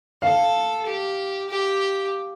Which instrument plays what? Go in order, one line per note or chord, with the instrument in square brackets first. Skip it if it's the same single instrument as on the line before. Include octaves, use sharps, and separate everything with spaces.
[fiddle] A4 [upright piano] F5
[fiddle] G4
G4